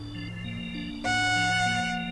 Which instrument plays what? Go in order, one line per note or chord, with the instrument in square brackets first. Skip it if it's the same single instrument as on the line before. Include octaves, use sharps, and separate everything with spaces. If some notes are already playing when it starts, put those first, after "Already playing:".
Already playing: [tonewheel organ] A2 D4
F3
A#3
D4
[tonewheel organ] A2 [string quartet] F#5
[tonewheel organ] F3
A#3